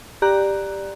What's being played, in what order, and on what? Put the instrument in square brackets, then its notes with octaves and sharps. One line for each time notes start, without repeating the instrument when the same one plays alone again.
[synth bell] G4 D5 A#5 F#6